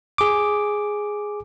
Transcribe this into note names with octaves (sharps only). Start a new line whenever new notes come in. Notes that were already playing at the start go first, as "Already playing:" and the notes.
G#4 D6